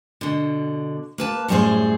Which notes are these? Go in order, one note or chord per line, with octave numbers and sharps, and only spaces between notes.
B2 D3
A#3 B4 A5
F#2 A2 G3 D4 G#4 C5